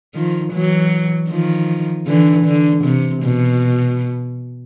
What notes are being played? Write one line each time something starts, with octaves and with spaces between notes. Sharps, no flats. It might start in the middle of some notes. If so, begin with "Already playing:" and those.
D#3 F3
E3 F#3
D#3 F3
D3 E3
D3
C3
B2